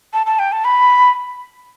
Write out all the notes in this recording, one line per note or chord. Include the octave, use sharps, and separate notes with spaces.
A5
A5
G5
A5
B5